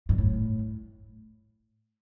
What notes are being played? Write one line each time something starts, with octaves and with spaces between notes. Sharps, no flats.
G2
A2